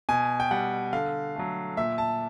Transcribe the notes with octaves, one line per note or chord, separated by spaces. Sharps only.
B2 G#5
G5
G3 F#5
D3 F5
F#3 A3
A#2 E5
A5